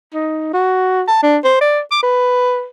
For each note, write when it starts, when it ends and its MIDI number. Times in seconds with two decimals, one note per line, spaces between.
0.14 0.51 63
0.53 1.02 66
1.08 1.20 81
1.23 1.38 62
1.44 1.60 72
1.61 1.80 74
1.91 2.00 86
2.03 2.66 71